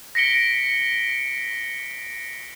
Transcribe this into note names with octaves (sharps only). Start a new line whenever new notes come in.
A#6 B6 C#7 D7 G7